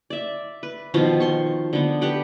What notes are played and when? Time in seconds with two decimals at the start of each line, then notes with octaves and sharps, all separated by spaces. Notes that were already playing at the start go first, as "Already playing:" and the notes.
0.10 D5 E5
0.63 B4
0.94 B2 D#3 F3 F5
1.20 C6 C#6
1.73 D3 B3
2.01 G4 B4 F#5 G5